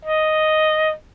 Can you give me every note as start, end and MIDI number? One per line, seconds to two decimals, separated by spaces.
0.05 0.91 75